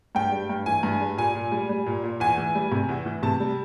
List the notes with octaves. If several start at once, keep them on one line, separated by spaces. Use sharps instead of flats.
G2 G5
G3
G2
E3 G#5
G2
G3
A#2 G#5
A#2
G3
G3
A#2
A#2
E2 G#5
E3
G3
C3
E2
E3
C3 A5
G3